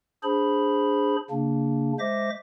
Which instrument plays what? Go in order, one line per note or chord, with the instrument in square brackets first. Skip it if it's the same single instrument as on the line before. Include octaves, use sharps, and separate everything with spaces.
[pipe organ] D4 G#4 C5 B5
C#3 A#3 D4
G#3 C5 E5 D6 A#6